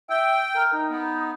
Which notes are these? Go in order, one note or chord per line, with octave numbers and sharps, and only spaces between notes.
E5 G5
A#4
D#4
B3